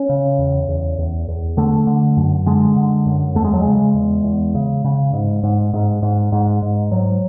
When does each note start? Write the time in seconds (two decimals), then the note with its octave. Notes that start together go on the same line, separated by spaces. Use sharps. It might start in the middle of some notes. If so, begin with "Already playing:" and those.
Already playing: C#4
0.09 C#3
0.39 E2
0.68 E2
0.98 E2
1.28 E2
1.57 D3 A3
1.87 D3
2.17 F#2
2.46 D3 G#3
2.76 D3
3.06 F#2
3.35 E2 A3
3.44 G#3
3.54 F#3
3.62 C#3 G#3
3.94 E2
4.24 E2
4.55 C#3
4.84 C#3
5.13 G#2
5.43 G#2
5.73 G#2
6.02 G#2
6.32 G#2
6.62 G#2
6.91 G#2 F#3